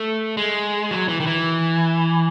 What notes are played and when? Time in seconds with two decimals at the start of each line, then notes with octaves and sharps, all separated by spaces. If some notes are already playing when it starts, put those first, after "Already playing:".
Already playing: A3
0.37 G#3
0.91 F#3
1.08 E3
1.20 D#3
1.26 E3